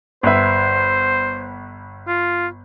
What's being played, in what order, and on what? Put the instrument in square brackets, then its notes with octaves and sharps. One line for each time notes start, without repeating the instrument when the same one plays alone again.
[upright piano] G1 B4 E5 [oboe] C5
[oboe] F4